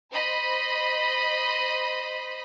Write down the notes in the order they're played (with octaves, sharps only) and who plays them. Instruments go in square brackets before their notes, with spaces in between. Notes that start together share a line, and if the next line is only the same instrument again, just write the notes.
[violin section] C5 D#5 B5